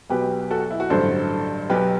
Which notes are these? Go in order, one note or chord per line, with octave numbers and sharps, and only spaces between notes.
B1 B2 F#3 G4 B4
F#4 A4
E4
F#4
A1 G2 D3 F#3 A4 C5
B1 B2 F#3 G4 B4